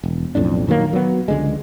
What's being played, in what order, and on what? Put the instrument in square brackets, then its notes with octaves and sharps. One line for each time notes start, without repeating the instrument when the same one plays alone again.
[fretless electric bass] E1
B1 F2 A2 D4
A#2 D#3 F#3 A#3
F#3 B3
C#2 D3 G#3